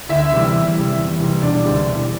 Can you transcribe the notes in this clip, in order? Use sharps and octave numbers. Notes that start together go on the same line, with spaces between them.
D2 E4 E5
C3 E3 G3
E2
C3 E3 G3
E2
C3 E3 G3
E1 D4 D5
D2 C3 E3 G3
E1